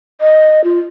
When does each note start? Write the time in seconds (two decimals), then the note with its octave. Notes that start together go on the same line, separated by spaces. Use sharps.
0.21 D#5
0.64 F4